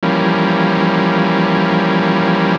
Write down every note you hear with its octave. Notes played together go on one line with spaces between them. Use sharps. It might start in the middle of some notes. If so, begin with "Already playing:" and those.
E3 F3 G3 A#3 C#4